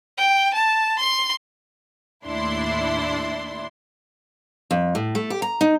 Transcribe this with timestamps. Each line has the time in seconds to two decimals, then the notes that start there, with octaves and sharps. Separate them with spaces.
0.18 G5
0.54 A5
0.99 C6
2.24 D#2 A2 D4 E4 C6
4.71 F2
4.95 A2
5.15 A3
5.30 G4
5.42 A#5
5.61 D#4